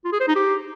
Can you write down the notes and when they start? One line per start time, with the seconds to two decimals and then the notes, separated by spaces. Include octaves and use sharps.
0.05 F4
0.13 G#4
0.20 C5
0.28 D#4
0.36 G4